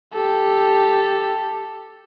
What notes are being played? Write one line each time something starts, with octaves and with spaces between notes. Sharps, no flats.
G4 A4